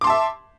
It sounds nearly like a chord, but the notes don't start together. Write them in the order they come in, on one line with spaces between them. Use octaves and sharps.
D6 C6 A5 E5